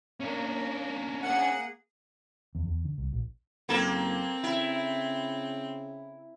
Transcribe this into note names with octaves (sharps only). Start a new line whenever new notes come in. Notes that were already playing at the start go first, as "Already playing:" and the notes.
A#3 C#4 D4 A#4
A#3 G#4 F#5
E2
E2
D3
C2
A#1
F#1 A#3 C4 A4
C#3 E4